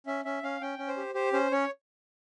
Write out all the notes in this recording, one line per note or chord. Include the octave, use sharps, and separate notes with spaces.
C#4 E5
C#4 E5
C#4 F5
C#4 G5
C#4
C5
G4
G4 C5
C#4 C5
C#4 C#5